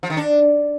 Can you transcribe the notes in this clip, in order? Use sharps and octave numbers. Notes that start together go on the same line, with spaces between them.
F3
D#3
D4